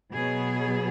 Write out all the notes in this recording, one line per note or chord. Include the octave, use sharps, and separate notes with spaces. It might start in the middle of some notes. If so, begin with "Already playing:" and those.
B2 F#3 B3 G#4